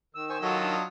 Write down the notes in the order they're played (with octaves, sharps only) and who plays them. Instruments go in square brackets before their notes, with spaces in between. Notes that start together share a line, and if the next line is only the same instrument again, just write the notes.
[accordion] D#3 E6
[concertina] C5 G#5 C#6
[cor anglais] F#3 [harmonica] F4 D#5 [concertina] F#4 A4
[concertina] D4 D#6